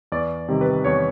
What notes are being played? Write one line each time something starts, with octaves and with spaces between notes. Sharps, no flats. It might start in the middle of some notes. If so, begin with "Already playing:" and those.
E2 D5
C3 D#3 G3
B4
E2 C#5